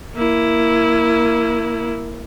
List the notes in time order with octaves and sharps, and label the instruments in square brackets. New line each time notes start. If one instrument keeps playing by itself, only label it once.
[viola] A#3 E4